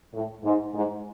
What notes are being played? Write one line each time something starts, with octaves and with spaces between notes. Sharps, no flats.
A2
G#2
G#2